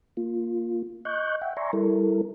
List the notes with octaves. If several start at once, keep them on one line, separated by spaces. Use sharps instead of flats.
A#3 F4
D#5 C#6 F#6 G6
E5 F#5 G5
D5 E5 G#5 A#5 C6 C#6
G3 E4 A4 A#4